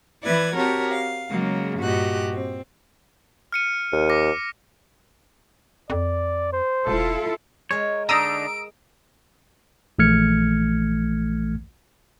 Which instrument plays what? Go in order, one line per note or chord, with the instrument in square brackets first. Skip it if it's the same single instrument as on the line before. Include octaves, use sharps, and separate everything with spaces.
[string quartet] E3 E4 B4 D5 G#6
C4 F#4 G4 A#4 C#5 A5
F5
C#3 F#3 G#3 A#3
G2 A#2 F#4 G4 D#5 F#6
C4
[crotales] F6 C#7 D#7
[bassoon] D#2
[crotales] D6 A#6
[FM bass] F2 [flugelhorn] D5
[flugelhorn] C5
[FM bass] E1 [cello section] E4 F4 A4
[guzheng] G#3 A#4 [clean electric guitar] C#5
[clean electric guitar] D3 D4 D#4 [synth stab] A#5 D#6 E6 [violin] D7
[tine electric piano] A#1 E3 A3 F6 G#6 C#7